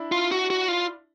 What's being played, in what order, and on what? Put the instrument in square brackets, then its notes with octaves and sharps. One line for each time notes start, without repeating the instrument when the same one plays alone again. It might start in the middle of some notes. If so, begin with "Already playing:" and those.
Already playing: [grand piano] D4 E4
[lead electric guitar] F4
F#4
F#4
F4